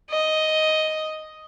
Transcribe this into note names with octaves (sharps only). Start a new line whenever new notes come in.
D#5